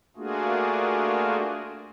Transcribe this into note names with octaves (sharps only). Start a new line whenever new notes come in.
A3 A#3 D4 F4 F#4 G#4